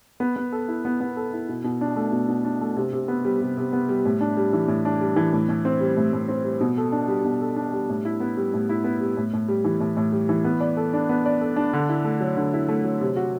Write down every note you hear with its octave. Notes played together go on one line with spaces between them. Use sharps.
B3
B3
A4
E4
B3
B3
A4
E4
B2
B2
D4
A3
B2
B2
D4
A3
C3
C3
B3
G3
C3
C3
B3
G3
A2
D4
G3
E3
A2
D4
G3
E3
A2
A2
C4
G3
A2
A2
C4
G3
B2
A4
D4
G3
B2
A4
D4
G3
A2
E4
B3
G3
A2
E4
B3
G3
A2
A2
G3
E3
A2
A2
G3
E3
B3
D5
A4
D4
B3
D5
A4
D4
D3
E4
A3
F#3
D3
E4
A3
F#3
C3
F#4